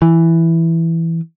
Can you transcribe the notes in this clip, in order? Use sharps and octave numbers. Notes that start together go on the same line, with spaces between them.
E3